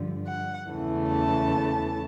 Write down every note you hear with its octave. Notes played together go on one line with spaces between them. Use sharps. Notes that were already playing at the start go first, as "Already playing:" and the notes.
Already playing: G2 D3 F3
F#5
E2 C#3 E3 A3
A5